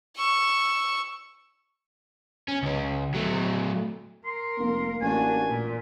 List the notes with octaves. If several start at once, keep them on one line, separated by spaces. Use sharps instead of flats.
C#6 E6
C#4
C#2 C#4
F#3 A3
A#4 C6
F1 A#3
A1 D4 F#4 G#5
A#2